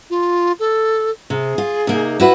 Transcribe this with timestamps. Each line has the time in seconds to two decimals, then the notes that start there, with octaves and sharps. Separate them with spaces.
0.10 F4
0.59 A4
1.30 C3 G#4
1.58 F4
1.87 C3 A#3 D#4
2.20 E4 F#4 B4